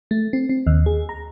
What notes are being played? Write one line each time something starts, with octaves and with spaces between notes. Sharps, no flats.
A3
C4
C4
D#2
G#4
A#5